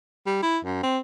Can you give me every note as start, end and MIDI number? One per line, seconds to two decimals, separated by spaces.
0.26 0.38 55
0.42 0.58 64
0.64 0.80 42
0.83 0.99 60